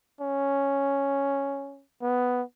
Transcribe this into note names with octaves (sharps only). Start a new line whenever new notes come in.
C#4
B3